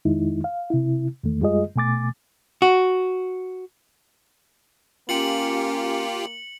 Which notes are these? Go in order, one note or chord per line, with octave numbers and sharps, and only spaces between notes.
F2 D#3 G#3 D#4 E4
F5
C3 E4
E2 D#3 A3
F#2 G3 G#3 F4 G#4 D#5
B2 A3 G#5 D6 A6
F#4
A#3 C#4 F4 G4 C#7 F#7